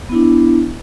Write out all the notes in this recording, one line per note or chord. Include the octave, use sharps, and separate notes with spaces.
B3 D4 E4